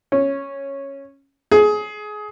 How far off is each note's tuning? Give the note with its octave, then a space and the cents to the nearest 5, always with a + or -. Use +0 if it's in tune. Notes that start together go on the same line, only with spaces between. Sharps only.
C#4 -10
G#4 +20